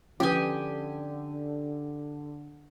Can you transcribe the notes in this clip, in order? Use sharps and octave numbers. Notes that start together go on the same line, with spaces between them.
D3 F3 C#4 G4 B4 G#5 D#6